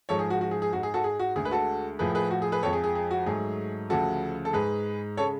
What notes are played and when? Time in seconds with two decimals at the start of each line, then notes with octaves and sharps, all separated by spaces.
0.09 G#2 F3 G#3 A4 C#5
0.19 G#4
0.30 F#4
0.41 F#4
0.51 G#4
0.62 G#4
0.73 G#2 G#3 F#4
0.83 G#4
0.94 F#4 A4
1.04 G#4
1.19 F#4
1.36 D2 D3 G#3 G#4
1.45 B4
1.51 F#4 A4
1.99 A2 F3 A3 G#4 B4
2.15 G#4 B4
2.31 F#4
2.42 G#4
2.52 G#4 B4
2.63 F2 F3 G#3 A4 C#5
2.73 G#4
2.84 G#4
2.95 G#4
3.11 F#4
3.26 G#2 F#3 A3 G#4
3.90 D2 C#3 F3 F#4 A4
4.45 A4
4.53 G#2 G#3 G#4 B4
5.17 C#3 G#3 A4 C#5